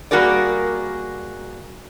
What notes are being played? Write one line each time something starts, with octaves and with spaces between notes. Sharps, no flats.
G3 A#3 F#4 G#4 A#4 D5